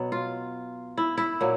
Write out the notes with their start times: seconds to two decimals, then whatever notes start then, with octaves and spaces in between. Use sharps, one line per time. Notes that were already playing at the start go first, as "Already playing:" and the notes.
Already playing: B2 F#3 B3
0.12 F4
0.98 E4
1.18 E4
1.41 A#2 F#3